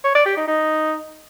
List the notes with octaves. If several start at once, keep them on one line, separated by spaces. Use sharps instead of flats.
C#5
D5
G4
D#4
D#4